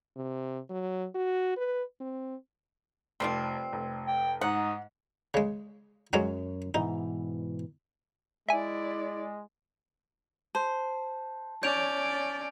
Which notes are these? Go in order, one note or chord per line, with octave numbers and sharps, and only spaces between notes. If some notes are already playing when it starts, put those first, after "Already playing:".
C3
F#3
F#4
B4
C4
F1 F3 G3 C4 C7
F1
G5
G#2 D#4 F#5
C#3 G#3
F#2 F#3 G#3 C#4
G#2 B2 E3 D#4
G#3 E4 D5 E5 G#5
C5 A5
C#4 C#5 D5 G6 D7 F7